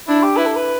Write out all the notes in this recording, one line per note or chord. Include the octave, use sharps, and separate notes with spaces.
D4 E4
G4
E4 B4
A4
B4